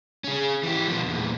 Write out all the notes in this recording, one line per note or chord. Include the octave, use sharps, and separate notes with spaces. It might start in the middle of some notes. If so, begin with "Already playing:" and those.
C#4 G#4
E3 G4
B2 F3
E2 A#2